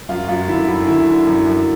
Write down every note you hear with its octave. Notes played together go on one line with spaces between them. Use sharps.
F#2 F4
F#2 F4
D3 E4
F#2 E4
D3 E4
D3
F#2
F#2